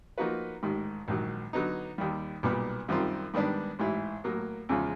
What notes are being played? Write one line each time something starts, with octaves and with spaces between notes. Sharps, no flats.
F3 A#3 D#4 F#4 B4
A1 G#2 D#3
A#1 G#2 D#3 F#3
D3 F#3 B3 D#4
D#2 D#3 G3
B1 A#2 G3 B3
F#2 D#3 G3 C4 F4
G#2 D#3 G3 B3 D4
A1 G#2 E3
A2 F#3 A#3
E2 C#3 F3 G#3 C#4